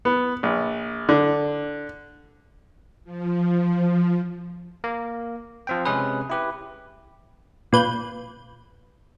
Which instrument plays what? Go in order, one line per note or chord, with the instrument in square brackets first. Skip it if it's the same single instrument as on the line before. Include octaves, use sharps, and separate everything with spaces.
[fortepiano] B3
A#1
D3
[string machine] F3
[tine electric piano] A#3
F3 C4 G5
C3 G#3 C#4 G#4 B4
E4 G4 B4
[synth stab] A#2 B4 G6